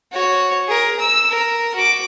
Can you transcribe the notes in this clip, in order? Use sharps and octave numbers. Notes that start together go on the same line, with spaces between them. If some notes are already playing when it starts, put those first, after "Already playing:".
F#4 C#5
G#4 A#4
E6
A#4
F#4 D6